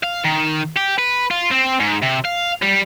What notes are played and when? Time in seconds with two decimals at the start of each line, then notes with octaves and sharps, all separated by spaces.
0.03 F5
0.25 D#3
0.76 G4
0.98 B4
1.31 F4
1.51 C4
1.80 G#2
2.03 C3
2.25 F5
2.62 G3